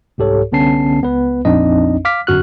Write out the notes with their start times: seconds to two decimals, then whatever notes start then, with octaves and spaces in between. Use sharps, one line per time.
0.18 C2 G#2 G4 A4 C#5
0.52 C2 D3 B3 C#4 A5 C7
1.01 C#2 B3 B4
1.45 A#1 F2 C4 D4 D#4 D#5
2.05 F5 D6 F6 B6
2.27 G1 F#2 F#4 F6 F#6